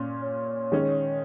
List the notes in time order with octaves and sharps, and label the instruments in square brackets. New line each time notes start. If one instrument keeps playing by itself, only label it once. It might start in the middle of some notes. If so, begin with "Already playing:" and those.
Already playing: [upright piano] A#2 C#4
[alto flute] C#5
[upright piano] D#3 G#3 C#4